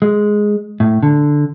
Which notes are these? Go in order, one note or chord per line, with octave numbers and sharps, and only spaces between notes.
G#3
A2
D3